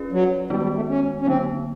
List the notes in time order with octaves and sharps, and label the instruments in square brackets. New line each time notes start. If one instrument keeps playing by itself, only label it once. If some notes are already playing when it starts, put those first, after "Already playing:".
Already playing: [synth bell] C#4 F4 G#4 B4 D5
[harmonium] F#3
[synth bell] D#3 G#3 B3 D#4 F#4 [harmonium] G3
[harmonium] G3
A3
C#4
C#4
[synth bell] D3 F#3 A#3 D#4 [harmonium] C4